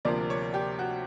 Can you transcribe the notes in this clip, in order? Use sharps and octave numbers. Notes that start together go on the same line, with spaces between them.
D2 C3 F3 A#3 D5
C#5
G4
F#4